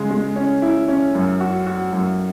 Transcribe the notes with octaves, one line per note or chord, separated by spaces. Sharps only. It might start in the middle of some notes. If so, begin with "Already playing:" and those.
Already playing: C#3 G#3
G#3
C#4
E4
C#4
F#2
F#4
F#4
F#2